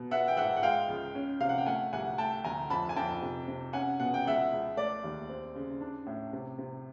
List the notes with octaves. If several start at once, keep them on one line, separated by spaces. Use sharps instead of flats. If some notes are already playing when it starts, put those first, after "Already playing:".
Already playing: B2
B3 E5 F#5
G5
G#2 E5 F#5
F#5
G#3 F5 G5
C#2
C#4
C3 F5
F#5
G5
A3 F#5 G#5
C2 F#5 G#5
A3 G5 A5
D2 G#5 A#5
F2 A5 B5
G#5
F2 G5 A5
C3
C3
C#4 F#5 G#5
B2 F#5
G5
C#2 E5 F#5
C#2
A3 D5
D#2
C4
C#3
D4
A2
C3
C3